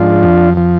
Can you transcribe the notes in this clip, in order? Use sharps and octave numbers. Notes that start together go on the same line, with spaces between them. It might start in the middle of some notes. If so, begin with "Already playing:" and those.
Already playing: G#2 F3 D4 F4
F2
F3